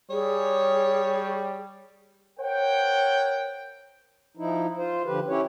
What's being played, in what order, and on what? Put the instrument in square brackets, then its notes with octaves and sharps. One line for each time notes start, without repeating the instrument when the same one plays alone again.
[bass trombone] G3 [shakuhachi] G#4 [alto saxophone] C#5
[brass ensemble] A#4 C5 C#5 F#5 G5
[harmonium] F3 D#4 E4
F4 C5
D3 F3 G4 B4
C#4 E4 G4 C#5